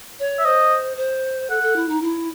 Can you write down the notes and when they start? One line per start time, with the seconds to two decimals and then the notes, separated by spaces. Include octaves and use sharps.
0.19 C#5
0.39 E5
0.45 C5 D#5
0.97 C5
1.50 A4 F#5
1.63 A4
1.76 E4
1.89 D#4
2.02 E4